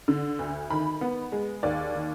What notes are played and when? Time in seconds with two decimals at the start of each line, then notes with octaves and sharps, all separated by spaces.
0.08 D3
0.39 D2
0.70 D#3 B5
1.01 B3
1.32 G#3
1.63 D#2 D5
1.95 D#3